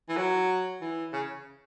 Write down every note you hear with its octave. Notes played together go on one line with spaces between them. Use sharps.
E3
F#3
E3
C#3